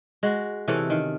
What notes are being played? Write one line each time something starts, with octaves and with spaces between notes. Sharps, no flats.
G#3 F#4
C3 E3 C#4 A4
D#3